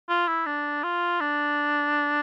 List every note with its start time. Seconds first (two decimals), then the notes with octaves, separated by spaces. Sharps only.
0.09 F4
0.28 E4
0.46 D4
0.83 F4
1.21 D4